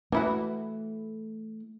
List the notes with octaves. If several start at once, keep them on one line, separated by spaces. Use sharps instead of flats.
E3 A3 E4 F#4